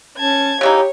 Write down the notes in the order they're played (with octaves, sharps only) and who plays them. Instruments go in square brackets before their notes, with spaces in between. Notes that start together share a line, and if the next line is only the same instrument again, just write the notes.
[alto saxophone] C#4 [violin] A5 G#6
[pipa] C#3 E3 D#4 [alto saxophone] G4 [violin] C#5